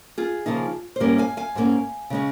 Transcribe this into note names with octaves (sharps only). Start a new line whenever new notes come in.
F4 G#4
C#3 F3 A#3 D#4
C5
G#2 G3 A#3 C#4 G4 A#4
F5 G#5
F5 G#5
G#2 G3 A#3 C#4
C#3 G#3 C#4